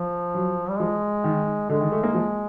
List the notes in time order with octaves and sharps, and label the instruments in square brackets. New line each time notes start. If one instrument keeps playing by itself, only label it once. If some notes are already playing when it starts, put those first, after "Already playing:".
Already playing: [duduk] F3
[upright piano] F#3
[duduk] G3
[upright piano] F3 [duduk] G#3
[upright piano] D#3
[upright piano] D3 [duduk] G#3
[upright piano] D#3
A3
A#3
F3